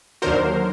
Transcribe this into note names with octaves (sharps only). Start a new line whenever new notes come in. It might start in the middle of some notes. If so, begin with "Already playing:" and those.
D#2 D3 F#3 A#4 C5